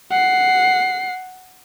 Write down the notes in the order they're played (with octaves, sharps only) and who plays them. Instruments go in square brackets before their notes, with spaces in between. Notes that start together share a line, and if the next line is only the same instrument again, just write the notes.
[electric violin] F#5 C7